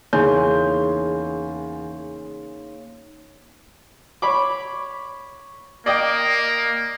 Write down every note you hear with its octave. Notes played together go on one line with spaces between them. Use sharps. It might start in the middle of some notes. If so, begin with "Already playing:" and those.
E2 C#3 A#3 D#4 G#5 C6 G6
C#5 B5 D6
A#3 D5 D#5 G5